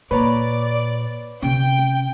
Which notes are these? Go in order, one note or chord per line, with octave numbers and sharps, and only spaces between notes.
A#2 B4 C#5 D5 A#5
C3 C#4 G5